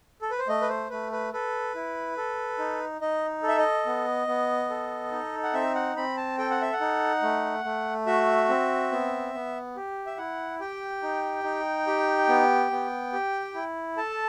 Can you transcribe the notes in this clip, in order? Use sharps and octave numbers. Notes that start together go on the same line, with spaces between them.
A4
B4
C5
A3 D#5
B4
C5
A3 B4
B4
A4 B4
E4
A4
D#4
D#4 D#5
A4
E5
D#5
B3
B3
A4
D#4
F#5
C4 E5
F#5
C4 B5
A5
A4 G5
F#5
E5
F#5
D#4
A3
A3
F#4 E5
C4
B3
B3
G4
E5
E4 F#5
G4 G5
D#4
D#4
G4
B3
B3
G4
E4
A4 A5